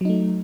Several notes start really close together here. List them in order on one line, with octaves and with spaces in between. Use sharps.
F#3 D#4 A3